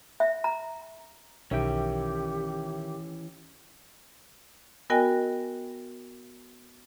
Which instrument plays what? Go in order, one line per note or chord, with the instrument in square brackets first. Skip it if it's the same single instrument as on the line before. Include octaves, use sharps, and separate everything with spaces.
[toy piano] E5
A#5
[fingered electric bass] B1 [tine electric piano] D#3 E5 G5 [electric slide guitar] E3 C#4 [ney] G4
[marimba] B3 F#4 A#4 D#5 G5 G#5